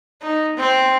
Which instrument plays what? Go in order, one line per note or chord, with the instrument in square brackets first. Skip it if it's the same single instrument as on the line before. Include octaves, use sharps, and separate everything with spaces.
[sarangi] D#4
C4